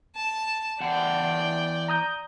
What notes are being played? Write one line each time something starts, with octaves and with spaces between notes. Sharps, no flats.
A5
E2 D5 F#5 G5 A5
A#5 D#6 G6